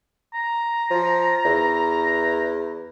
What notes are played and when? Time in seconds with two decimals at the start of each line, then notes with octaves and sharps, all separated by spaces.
0.34 A#5
0.90 F3
1.45 E2